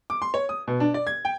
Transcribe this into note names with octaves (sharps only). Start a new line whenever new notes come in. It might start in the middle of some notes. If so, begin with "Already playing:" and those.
D6
C6
C#5
D#6
B2
D4
D5
G#6
G5